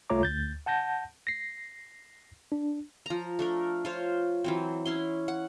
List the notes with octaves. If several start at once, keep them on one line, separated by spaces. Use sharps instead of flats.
C2 A3 F4 C#5 A#5 D6
D2 G6 A6
F#5 A5 G6 A#6
A#6 C7
D4
F3 A#5
A3 D4 A#4
F4 C5 C#5
E3 F#3 C4
C#4 E4 C6
F#5